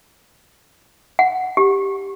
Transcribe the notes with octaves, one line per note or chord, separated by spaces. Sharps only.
F#5
G4